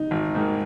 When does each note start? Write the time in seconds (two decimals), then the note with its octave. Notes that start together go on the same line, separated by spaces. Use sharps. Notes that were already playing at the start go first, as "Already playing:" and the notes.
Already playing: D#4
0.11 G#1
0.35 G#2 D#3 A#3